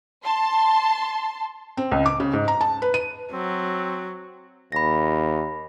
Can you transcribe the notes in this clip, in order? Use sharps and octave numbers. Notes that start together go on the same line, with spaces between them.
A5 C6
C4
C#2
D6
C#3
G#2
A#5
A5
B4
D#7
F#3 C4
D#2 B5 A#6